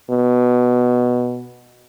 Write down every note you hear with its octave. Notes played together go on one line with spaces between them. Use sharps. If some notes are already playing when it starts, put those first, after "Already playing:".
B2